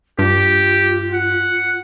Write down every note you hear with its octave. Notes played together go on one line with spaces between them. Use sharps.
G2 F4 G4
F#5